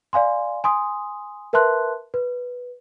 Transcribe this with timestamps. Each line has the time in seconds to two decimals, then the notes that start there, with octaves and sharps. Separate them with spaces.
0.13 D5 F5 G#5 C6
0.64 G#5 C6 D#6
1.53 A#4 B4 E5 A5 C6 F#6
2.14 B4